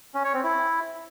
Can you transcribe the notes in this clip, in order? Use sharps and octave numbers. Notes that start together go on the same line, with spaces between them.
C#4
C#5
C4
E4